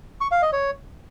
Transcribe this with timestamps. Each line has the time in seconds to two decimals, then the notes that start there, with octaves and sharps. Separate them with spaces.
0.21 C#6
0.31 F5
0.42 D#5
0.53 C#5